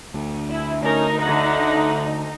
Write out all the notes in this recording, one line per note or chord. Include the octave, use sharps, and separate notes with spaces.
D2
E4
D2 C#4 D#4 A#4
D3 A3 F#5